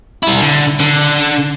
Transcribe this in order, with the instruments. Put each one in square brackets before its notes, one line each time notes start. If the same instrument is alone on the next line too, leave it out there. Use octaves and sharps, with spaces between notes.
[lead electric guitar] G3 E4
D3
D3